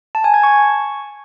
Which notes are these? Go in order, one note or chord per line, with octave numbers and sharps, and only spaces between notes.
A5
G#5
G#6
C#6